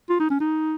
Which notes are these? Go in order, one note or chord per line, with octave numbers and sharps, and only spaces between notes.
F4
D#4
C#4
D#4